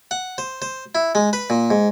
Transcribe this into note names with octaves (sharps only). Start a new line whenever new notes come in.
F#5
C5
C5
E4
G#3
B4
A#2
G#2